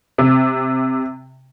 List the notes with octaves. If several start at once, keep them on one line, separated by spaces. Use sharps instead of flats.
C3